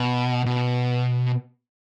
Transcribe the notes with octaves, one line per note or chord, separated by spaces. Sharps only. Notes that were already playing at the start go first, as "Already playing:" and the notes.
Already playing: B2
B2